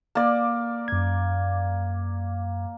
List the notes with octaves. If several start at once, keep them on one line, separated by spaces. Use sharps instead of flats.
A#3 D5
F#2 G#6